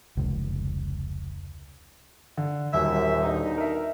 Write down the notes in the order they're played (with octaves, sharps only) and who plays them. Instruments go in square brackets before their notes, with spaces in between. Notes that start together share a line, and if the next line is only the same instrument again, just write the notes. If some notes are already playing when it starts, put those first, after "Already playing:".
[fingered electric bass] F1 C#2
[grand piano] D3
[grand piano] D#1 [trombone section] F#2 [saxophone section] E5
[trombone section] B2 D3 [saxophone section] D#4
[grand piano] A#4 E5